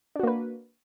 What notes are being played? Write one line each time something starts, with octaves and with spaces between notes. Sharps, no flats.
A#3 D4 F#4 B4